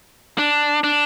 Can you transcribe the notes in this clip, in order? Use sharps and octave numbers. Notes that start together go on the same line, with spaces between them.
D4
D4